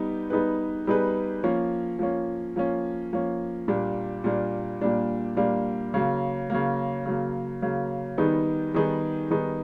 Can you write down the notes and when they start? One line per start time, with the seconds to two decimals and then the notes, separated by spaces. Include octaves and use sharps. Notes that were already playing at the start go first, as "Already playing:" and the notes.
Already playing: G3 B3 D#4 B4
0.30 G3 B3 D#4 G#4 B4
0.87 G3 B3 D#4 G#4 B4
1.44 F3 A#3 C#4
1.99 F3 A#3 C#4
2.56 F3 A#3 C#4
3.13 F3 A#3 C#4
3.68 A#2 G3 A#3 D4
4.24 A#2 G3 A#3 D4
4.81 A#2 G3 A#3 D4
5.37 A#2 G3 A#3 D4
5.94 C#3 F#3 A#3
6.50 C#3 F#3 A#3
7.06 C#3 F#3 A#3
7.62 C#3 F#3 A#3
8.18 D#3 G3 B3 D#4 G#4
8.74 D#3 G3 B3 D#4 G#4
9.31 D#3 G3 B3 D#4 G#4